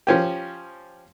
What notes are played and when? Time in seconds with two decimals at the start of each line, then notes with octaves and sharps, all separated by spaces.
0.07 F3 C#4 G4